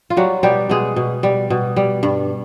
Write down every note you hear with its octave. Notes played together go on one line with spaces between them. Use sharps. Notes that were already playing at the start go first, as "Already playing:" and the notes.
F4
F#3 G3 F#4
B2 G3 G4
B2 G#3 G#4
B2
G3
B2
G3
G2